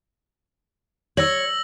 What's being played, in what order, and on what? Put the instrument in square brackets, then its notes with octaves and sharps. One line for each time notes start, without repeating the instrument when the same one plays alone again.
[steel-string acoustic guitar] C#5 [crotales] E6 A#6 F#7